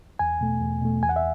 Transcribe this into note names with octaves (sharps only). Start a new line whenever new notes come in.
E2 G#5
B2 A3
E2
B2 A3
E2 G#5
F#5
E5